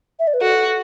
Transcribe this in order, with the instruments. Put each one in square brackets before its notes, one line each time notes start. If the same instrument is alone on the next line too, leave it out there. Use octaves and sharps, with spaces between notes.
[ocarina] E5
D5
B4
[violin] F#4 [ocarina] A4